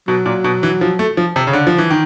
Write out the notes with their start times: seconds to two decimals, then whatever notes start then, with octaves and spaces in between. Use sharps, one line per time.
0.08 B2 F#3
0.26 A#2
0.44 B2
0.63 E3
0.81 F3
0.99 A3
1.17 F3
1.36 C3
1.47 C#3
1.53 D3
1.67 F3
1.78 E3
1.90 D#3